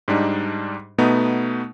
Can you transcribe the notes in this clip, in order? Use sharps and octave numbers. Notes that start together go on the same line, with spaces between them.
G#2 G3 D4 D#4
B2 A3 B3 D#4